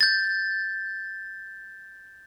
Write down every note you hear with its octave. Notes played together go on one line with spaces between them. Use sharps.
G6 A6